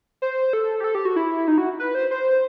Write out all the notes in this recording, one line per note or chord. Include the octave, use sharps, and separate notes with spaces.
C5
A4
G4
A4
G4
F#4
E4
D#4
F#4
B4
C5
C5